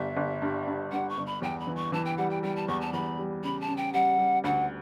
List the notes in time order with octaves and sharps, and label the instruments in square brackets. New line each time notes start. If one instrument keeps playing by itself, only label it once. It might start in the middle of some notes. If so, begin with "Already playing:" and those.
Already playing: [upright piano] G1 G3 [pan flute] E5
[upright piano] G1
G2
G2
[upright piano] G2 [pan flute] F#5
[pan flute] C#6
[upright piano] G1
[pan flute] B5
[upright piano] E2 [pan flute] G5
[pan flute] B5
[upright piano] E3
[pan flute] C#6
[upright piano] E3 [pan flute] A5
[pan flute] G5
[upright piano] G3 [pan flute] F#5
[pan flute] G5
[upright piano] G3 [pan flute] G5
[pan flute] A5
[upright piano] E2 [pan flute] C#6
[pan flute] A5
[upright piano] E2 [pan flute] B5
[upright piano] G3
[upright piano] C#3 [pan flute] B5
[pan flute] A5
[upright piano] C#3
[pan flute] G5
[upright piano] G3 [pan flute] F#5
[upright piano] G3
[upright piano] D2 [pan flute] F#5